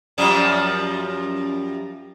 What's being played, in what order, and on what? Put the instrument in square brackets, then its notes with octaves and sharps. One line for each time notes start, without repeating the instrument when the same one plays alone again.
[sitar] F#2 F3 G3